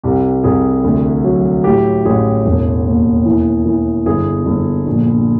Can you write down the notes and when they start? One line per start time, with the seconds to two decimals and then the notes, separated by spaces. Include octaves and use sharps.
0.03 C2 G4
0.44 C2 G#4
0.84 D2
1.24 F#3
1.64 A2 G4
2.05 A1 G#4
2.45 E1
2.86 D#2
3.26 E3
3.66 E3
4.06 G1 G#4
4.46 G1
4.87 A#1